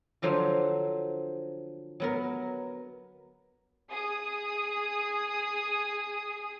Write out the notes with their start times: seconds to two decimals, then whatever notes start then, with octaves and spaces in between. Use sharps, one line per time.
0.22 D3 F3 F#3 C5
2.00 F#3 B3 A#4
3.91 G#4 D#6